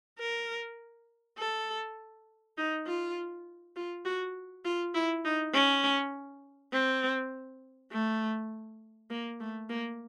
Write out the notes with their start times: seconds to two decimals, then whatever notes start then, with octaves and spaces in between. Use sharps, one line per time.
0.19 A#4
1.38 A4
2.58 D#4
2.87 F4
3.76 F4
4.05 F#4
4.65 F4
4.94 E4
5.24 D#4
5.54 C#4
6.72 C4
7.92 A3
9.10 A#3
9.40 A3
9.69 A#3